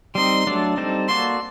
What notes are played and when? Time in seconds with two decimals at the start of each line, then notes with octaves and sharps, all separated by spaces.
0.15 G3 C4 D#4 C6
0.47 F#3 A3 D4 A4 D5
0.77 G3 C4 D#4 A4 C5
1.08 A#3 F#4 A4 D5 C6